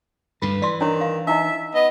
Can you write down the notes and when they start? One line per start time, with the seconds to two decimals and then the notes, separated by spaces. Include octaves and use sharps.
0.42 D2 G2 D3 B4
0.62 E3 D5 C6
0.81 D#3 D4 E4 C#5
1.01 F5
1.27 D#4 E4 D#5 E5
1.75 B3 D#5